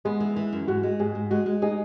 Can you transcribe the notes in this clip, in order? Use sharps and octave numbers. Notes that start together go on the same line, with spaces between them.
G#3 B3
E3
E3
F#2
G#2 F#4
G#3
G#2 G#4
G#2
G#3 F#4
G#3
D#4 G#4